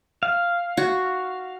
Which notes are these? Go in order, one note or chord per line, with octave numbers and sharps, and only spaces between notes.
F5
F#4